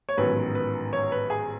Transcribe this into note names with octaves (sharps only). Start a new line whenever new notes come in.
C#5
A1 G#2 D#3 F#3 B3 B4
B4
C#5
B4
G#4